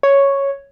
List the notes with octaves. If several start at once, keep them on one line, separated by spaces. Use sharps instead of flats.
C#5